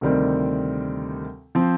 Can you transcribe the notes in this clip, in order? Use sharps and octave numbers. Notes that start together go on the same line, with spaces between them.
D2 C3 D#3 G3 C4
F3 C4